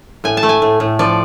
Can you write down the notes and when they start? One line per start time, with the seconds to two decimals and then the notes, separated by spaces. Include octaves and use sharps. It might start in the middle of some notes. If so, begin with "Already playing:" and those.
0.24 A2 G#5
0.37 A5
0.43 A3
0.49 G#5
0.62 A2
0.80 A2
0.99 F3 D5